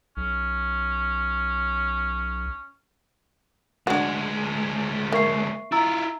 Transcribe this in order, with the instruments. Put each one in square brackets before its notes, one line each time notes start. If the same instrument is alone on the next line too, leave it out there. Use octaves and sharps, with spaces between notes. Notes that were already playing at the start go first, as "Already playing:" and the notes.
[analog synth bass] B1 [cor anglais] C#4
[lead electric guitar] D2 G#3 [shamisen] D4 F#4
[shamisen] A#3 [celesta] E5 C#6 C7
[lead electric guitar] E4 F4 [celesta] A#5 E6 A6